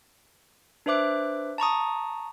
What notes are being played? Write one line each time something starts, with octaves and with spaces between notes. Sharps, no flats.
D4 B4 C5 E5 D6 F#6
A5 A#5 C#6 D#6